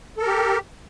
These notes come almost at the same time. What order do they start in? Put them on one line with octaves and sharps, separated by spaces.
A4 A#4 G4